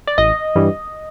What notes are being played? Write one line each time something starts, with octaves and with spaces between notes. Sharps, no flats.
D5
A1 D#5
G2 E3 G3